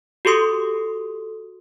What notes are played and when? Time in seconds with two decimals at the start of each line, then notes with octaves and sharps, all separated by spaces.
0.25 F#4 G4 A4 C6 D#6